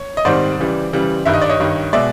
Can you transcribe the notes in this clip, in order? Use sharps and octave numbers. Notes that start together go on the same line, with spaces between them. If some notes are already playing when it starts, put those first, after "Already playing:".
Already playing: C#5
D#5
G#2 D#3 G3 C4 C5 D5
C#3 E3 G3
C#3 E3 G3
G2 D#3 G3 E5
D#5
D5
C#5 D#5
G2 D#3 G3
B2 G#3 D5 E5